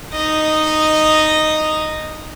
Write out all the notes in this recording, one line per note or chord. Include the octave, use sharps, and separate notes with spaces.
D#4 D#5